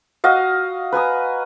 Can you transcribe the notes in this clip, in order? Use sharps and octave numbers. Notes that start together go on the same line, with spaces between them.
F#4 D#5 F5
B4 G#5 A#5 D#6